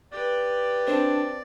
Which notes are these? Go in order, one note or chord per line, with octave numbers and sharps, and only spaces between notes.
G4 B4 D5
C4 D4